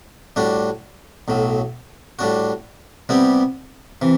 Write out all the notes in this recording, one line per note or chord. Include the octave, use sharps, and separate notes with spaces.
A2 G3 D4 F#4
B1 A2 F#3
A2 G3 D4 F#4
C3 G3 B3 E4 G4
C3 E3